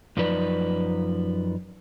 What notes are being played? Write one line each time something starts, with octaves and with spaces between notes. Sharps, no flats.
F#2 F3 D#4 B4 D5